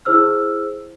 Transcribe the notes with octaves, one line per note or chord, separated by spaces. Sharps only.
E4 G#4 C5 E6 F6